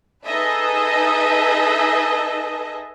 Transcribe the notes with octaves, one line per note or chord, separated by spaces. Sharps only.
D#4 G#4 A4 B4 D#5 E5